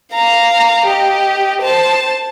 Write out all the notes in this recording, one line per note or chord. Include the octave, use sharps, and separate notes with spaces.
F5 A#5
G4 D#5
C5 A5